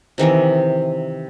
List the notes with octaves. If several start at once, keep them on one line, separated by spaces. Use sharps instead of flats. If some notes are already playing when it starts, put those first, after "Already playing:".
C3 D#3 E3 A#4